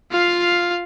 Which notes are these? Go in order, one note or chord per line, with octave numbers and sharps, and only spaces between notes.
F4 F5